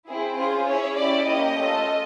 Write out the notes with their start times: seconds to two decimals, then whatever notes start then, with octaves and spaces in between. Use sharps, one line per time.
0.08 C4 E4 G#4
0.37 C#4 F4 G#4 C5
0.67 C#4 E4 G#4 C#5
0.97 C#4 E4 G4 D5
1.26 A#3 C#4 E4 G4 D#5
1.56 A3 C#4 F4 A4